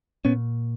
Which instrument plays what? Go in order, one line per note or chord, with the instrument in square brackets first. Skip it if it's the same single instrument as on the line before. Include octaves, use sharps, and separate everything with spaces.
[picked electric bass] A#2 B3 C#4